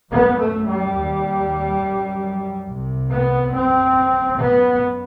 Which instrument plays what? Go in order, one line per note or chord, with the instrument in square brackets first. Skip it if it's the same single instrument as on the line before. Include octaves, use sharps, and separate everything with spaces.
[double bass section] F#2 B3
A3
G3
D#2
F#2
C2 C3
B3
F#2 C4
F#2 B3